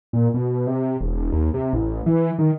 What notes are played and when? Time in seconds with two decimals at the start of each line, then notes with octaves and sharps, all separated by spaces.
0.13 A#2
0.34 B2
0.67 C3
1.00 E1
1.32 D#2
1.54 C3
1.73 A1
2.06 E3
2.39 D#3